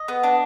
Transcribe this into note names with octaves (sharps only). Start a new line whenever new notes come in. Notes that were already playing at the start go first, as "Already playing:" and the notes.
Already playing: D#5
B3
D4